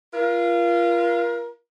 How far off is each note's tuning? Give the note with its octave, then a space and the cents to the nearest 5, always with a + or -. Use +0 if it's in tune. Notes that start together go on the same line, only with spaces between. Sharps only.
F4 -20 A#4 +35